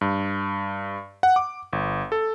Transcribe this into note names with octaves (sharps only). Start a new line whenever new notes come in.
G2
F#5
D6
G1
A4